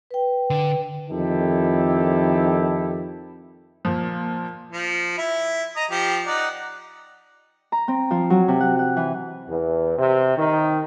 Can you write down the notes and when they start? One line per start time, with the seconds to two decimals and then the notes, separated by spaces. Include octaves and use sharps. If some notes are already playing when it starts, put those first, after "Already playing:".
0.11 B4 G5
0.50 D3
1.10 F2 D#3 E4 G4 A4
3.85 A#2 F3
4.73 F3
5.18 E4
5.76 D#5 A#5
5.90 F3 G4
6.26 D#4 D5 F#5
7.72 A#5
7.88 C4
8.11 F3
8.30 F#3
8.48 C3
8.60 F#5
8.79 F#5
8.97 E3
9.49 E2
9.98 C3
10.38 D#3